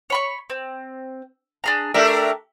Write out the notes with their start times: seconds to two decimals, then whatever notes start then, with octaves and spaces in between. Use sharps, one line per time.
0.10 C#5 B5 C#6
0.50 C4
1.64 D4 G#4 A#5
1.94 A3 D4 G4 A#4 E5 A#5